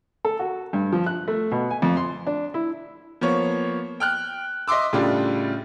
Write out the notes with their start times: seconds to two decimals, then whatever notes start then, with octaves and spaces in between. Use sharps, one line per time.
0.25 A4
0.39 F#4
0.73 G2
0.93 F3
1.06 F#6
1.28 A3
1.52 B2
1.70 G#5
1.82 F2
1.97 C6
2.27 D4
2.54 E4
3.21 F3 A#3 B3 C#5
4.00 G5 F6 F#6
4.68 D#5 E5 C6 D6 E6
4.93 A2 C#3 G3 D4 F4